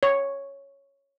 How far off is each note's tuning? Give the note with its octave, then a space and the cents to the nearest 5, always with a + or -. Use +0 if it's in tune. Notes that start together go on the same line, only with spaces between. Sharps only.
C#5 +0